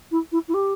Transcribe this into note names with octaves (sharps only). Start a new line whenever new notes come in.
E4
E4
E4
G4